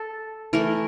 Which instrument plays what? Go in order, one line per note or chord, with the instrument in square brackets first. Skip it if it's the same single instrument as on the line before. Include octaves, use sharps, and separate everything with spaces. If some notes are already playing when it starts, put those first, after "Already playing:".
Already playing: [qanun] A4
E3 A3 A#4